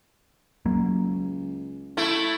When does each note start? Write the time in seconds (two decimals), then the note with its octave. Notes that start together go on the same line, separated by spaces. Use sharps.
0.66 C#2 F#3 A#3
1.97 A3 E4